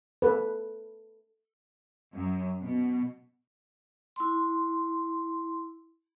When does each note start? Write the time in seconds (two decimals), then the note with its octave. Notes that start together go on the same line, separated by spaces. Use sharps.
0.22 A4 B4
2.13 F#2
2.61 B2
4.16 E4 C6